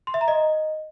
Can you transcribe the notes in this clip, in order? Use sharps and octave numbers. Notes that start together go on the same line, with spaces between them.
C6
E5
A#5
D#5